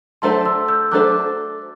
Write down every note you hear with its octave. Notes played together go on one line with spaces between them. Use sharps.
F#3 A3 D4 A4 C5 A5 C6
C6 E6
E6 G6
F#3 A3 D4 A4 C5 D6 F#6